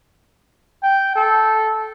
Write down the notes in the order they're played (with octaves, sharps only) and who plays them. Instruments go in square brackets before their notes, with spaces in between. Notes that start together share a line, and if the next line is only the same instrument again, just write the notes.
[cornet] G5
A4